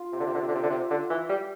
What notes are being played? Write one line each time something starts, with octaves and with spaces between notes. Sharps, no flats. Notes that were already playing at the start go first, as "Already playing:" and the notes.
Already playing: F4
C3
D3
C3
D3
C3
D3
C3
D3
C3
D3
E3
G3